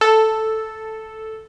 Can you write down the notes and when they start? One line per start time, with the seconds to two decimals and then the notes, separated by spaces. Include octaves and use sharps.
0.01 A4